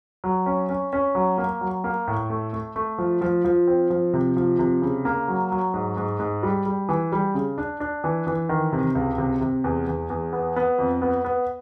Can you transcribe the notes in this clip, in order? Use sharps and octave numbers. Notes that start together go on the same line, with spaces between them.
F#3
C#4
C#4
C#4
F#3
A#3
F#3
A#3
A2
A3
A3
A3
F3
F3
F3
C4
F3
C3
F3
C3
C#3
A#3
F#3
F#3
G#2
G#2
G#2
G3
G3
E3
G3
C#3
D4
D4
E3
E3
D#3
C3
C#2
C3
C3
E2
E2
E2
B3
B3
F2
B3
B3